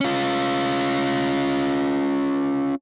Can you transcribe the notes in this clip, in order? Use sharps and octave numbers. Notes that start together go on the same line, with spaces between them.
C#4 F4